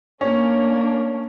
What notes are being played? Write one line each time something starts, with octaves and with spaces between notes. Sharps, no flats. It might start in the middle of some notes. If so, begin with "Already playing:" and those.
A3 A#3 C#4 D4